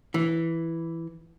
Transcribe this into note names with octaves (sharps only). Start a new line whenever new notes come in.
E3